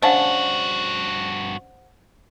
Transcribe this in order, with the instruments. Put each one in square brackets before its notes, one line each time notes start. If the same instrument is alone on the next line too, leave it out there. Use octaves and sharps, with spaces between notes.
[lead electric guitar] G2 F#4 [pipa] C#3 D4 A5 [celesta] C5 F#5